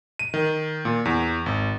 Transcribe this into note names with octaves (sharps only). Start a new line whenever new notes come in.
D#7
D#3
A#2
E2
G#1